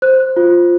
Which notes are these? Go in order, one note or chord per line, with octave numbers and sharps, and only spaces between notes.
C5 F#6
F4